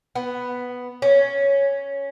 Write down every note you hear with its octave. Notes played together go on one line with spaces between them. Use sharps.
B3
C#4